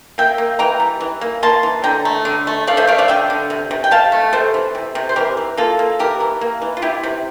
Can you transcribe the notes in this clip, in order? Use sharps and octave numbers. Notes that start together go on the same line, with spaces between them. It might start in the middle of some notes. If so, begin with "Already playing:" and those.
A#3 E5 G5
A#3
E3 G5 A#5
G3
E3
A#3
A#3 A5 C6
E3
D3 G5 A#5
A3
D3
A3
A3 D5 F5
C5 E5
A3 D5 F5
D5 F5
D3 E5 G5
D3
C3
C3
G5
C3 F5 A5
A3
C3 A4 C5
E3
C3
C3
C5
E3 G4 A#4
E3
A#3 F4 A4
A#3
E3 G4 A#4
E3
A#3
E3
F4
C3 E4 G4
C3